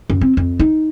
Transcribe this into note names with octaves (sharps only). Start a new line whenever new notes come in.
F#2
C4
F2
D#4